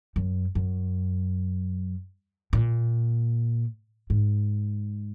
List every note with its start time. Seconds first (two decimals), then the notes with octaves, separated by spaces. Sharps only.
0.16 F#2
0.55 F#2
2.53 A#2
4.10 G#2